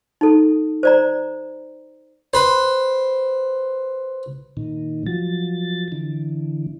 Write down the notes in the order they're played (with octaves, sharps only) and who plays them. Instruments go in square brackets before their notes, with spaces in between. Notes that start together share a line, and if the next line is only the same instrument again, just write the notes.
[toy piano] D#4 A4
C5 D5 A#5
[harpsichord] B4 C5
[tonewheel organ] A#2 D#3
F3 F#3 A6
D3 E3